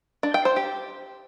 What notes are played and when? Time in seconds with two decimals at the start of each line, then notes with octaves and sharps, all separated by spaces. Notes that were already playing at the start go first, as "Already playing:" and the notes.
0.23 D4
0.34 G5
0.45 C5
0.56 G4